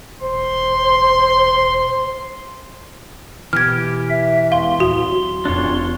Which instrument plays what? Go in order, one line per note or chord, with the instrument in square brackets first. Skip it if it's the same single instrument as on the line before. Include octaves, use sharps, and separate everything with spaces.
[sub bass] E1 [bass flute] C5 [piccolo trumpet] C6
[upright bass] B2 [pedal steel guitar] E3 G4 [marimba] F6 G#6
[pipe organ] E5
[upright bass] E1 [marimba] F5 [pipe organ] C6
[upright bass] D1 [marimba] F#4
[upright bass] E1 E2 [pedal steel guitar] D4 F4 C#5